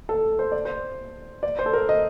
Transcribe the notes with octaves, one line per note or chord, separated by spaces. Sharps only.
A4
C5
D5
C5
D5
C5
A4
A#4
D#5